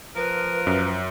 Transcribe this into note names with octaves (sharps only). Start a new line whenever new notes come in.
F3 A#4 B4
F#2